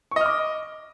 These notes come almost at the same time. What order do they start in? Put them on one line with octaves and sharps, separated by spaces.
C#6 D#5 F6 D6